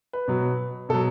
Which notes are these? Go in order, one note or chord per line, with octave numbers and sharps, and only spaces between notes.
B4
B2 F#3
B2 F#3 A4